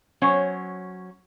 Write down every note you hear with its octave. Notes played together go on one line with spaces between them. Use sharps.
F#3 C#4 C5